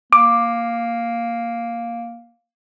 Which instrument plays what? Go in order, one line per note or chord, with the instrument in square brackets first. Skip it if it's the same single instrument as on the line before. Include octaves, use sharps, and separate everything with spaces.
[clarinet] A#3 [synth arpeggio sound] D6